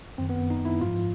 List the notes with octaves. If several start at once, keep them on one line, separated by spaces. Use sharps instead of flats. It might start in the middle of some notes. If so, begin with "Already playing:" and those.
F#2 D#3 C4
B3
D#4
E4
G#2 F3 F4